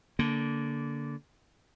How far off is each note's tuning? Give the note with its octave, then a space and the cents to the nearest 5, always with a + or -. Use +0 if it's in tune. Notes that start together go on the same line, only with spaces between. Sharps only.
D3 -20 A#3 +0